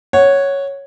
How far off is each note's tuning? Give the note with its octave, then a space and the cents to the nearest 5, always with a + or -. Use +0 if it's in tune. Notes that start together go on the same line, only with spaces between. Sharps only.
C#5 +0 F#5 +0